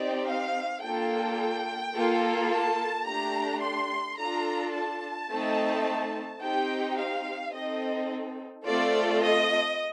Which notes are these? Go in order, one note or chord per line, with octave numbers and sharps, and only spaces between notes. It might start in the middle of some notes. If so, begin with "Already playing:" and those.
Already playing: C4 D#4 G4 D5
F5
A#3 D4 F4 A4 G5
A#3 F4 A4
A5
A3 D4 G4 A#5
C6
D4 F4 A4 A#5
A5
A3 C4 D#4
C4 D#4 G4 G5
F5
C4 D#4 A4 D#5
A3 C4 F4 A4 D5
D#5